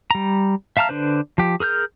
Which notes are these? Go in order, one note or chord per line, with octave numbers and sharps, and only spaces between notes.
G3 A#5
E5 F5 A5 A#5 F6
D3 D4 B4 C5
F3 G4
G#4 A#4 F6 G6